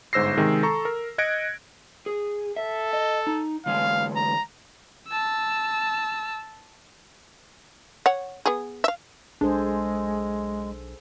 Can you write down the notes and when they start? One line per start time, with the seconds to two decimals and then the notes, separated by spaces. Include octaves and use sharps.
0.13 G1 G#2 C5 E6 A#6 C7
0.38 C3 D#3 G#3
0.63 A4 A#5 C#6
0.85 A#4
1.18 D#5 F#6 G#6 A#6 C#7 D7
2.06 G#4
2.56 A4 E5
2.93 D#5
3.27 D#4
3.66 D3 E3 G#3 F5
4.16 A#5
5.08 A5 E6
8.06 C#5 F#5
8.46 B3 G#4
8.84 E5 F5
9.41 B1 G#3 D4 G#4 A4 C5